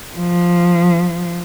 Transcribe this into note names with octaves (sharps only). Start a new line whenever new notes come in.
F3